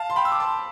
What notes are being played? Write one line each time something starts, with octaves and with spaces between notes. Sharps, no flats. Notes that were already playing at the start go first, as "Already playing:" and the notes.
Already playing: F5 A5
C6
G5 B5
E6
D6
A5 C6